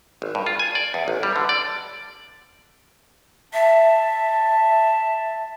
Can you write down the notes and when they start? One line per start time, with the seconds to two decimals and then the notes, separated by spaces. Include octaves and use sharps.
0.22 G#1
0.35 G2
0.46 F4
0.59 G#5
0.75 D5
0.94 E2
1.08 A1
1.23 G3
1.36 D3
1.49 D5
3.53 E5 A5